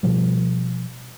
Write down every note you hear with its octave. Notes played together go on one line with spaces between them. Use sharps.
B2 F3 G3